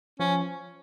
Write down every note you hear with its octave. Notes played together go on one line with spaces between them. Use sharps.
F3 C#4